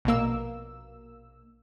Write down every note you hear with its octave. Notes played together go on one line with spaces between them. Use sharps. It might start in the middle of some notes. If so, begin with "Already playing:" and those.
A#1 B2 A#3 E6